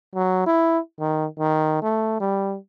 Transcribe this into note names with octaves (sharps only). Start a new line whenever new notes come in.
F#3
E4
D#3
D#3
A3
G3